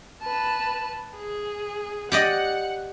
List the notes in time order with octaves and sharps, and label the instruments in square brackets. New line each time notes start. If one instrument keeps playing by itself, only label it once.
[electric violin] B4 A5
G#4
[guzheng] G4 D5 D#5 [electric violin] F#5